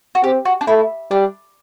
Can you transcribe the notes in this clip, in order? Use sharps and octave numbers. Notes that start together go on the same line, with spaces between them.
F#4
C4 G4
F#4
D4
A3 E4
G3 D4